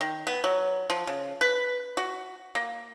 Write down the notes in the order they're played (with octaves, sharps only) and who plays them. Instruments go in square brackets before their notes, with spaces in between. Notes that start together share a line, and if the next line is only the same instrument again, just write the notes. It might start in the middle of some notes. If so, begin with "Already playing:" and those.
[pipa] D#3
B3
F#3
F3
C#3
B4
F#4
A#3